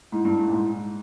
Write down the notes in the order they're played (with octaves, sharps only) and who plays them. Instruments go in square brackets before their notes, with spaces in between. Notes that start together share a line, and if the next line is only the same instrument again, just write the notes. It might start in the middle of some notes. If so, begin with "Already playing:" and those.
[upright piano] G#2 [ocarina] E4
[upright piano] G2
G#2
A#2
G#2